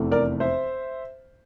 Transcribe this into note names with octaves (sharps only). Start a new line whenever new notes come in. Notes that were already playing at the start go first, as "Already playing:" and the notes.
Already playing: F1 E2 E3 A3 C4
A#4 D5
C5 E5